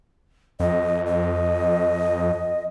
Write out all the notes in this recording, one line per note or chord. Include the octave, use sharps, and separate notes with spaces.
F2 D#5
D#5